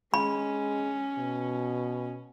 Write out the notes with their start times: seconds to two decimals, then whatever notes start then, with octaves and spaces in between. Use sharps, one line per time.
0.14 G#3 C#4 B5
1.18 B2